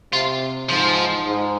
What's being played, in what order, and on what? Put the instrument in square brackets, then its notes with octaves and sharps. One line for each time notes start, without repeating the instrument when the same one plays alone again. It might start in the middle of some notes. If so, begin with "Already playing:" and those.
[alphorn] C3 [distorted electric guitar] F4
[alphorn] G#2 [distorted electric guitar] F3
[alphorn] G#2